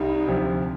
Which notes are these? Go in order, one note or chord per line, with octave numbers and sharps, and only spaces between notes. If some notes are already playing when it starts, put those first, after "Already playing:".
Already playing: C2 G3 D#4
D2 C3 F3